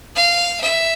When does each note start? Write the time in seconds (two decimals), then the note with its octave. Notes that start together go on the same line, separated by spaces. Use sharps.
0.16 F5
0.61 E5